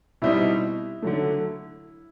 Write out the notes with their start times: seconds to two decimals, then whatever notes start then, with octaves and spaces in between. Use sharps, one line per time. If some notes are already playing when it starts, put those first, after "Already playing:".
0.22 B2 G3 C4 D#4 E4
1.02 D3 F#3 A3